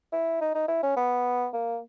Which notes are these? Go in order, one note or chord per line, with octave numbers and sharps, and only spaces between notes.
E4
D#4
D#4
E4
C#4
B3
A#3